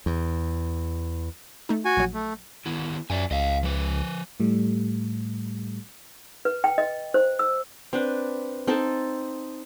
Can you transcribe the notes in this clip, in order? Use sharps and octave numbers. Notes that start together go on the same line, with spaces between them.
E2
A3 D#4
F#4 G#5
A#1 F#3
A3
D#3 B3 E4
F#2 D5 E5 G#5
C#2 D#5 F5
F3 B4
A2 G3 A3
B4
G5
D#5
C5
E6
C4 D4 B4
C4 D#4 A4